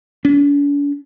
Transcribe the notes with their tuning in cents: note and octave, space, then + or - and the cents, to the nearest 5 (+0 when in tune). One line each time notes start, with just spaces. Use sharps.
D4 -45